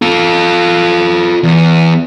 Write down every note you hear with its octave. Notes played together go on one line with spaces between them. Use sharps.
F4 A4
E2